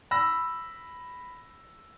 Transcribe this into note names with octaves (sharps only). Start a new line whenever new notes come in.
B5 E6 A#6